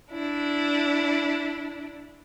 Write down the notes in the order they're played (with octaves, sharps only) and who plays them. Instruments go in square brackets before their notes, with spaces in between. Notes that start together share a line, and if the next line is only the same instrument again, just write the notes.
[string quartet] D4 E4